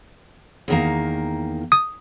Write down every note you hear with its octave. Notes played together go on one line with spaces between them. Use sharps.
E2 D#3 A#3
D#6